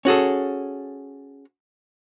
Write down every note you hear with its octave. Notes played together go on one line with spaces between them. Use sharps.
C#4 F#4 G#4 A4